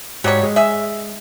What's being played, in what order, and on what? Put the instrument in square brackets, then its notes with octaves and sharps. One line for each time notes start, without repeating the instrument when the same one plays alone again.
[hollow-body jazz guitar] G#2 G4 [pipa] F#3 G3 C#5
[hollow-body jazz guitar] G#3
[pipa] G#4 E5